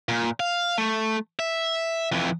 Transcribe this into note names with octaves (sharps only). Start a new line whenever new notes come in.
A#2
F5
A3
E5
F2 E3